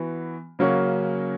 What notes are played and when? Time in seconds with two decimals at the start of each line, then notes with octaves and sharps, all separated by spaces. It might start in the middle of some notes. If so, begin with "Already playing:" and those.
Already playing: E3 B3 F#4
0.59 C#3 F#3 A#3 C#4 F#4